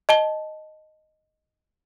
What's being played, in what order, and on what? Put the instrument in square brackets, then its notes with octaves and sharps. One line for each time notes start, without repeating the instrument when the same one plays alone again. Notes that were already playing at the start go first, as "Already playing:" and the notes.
[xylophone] D#5 A5 G7